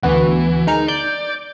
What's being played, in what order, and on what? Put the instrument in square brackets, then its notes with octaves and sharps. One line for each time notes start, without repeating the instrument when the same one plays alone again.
[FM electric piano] D2 B3 F#4 [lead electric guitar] E3
[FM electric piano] G#3 A#4 F6 [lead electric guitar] D#4
[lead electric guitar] D5 [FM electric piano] G6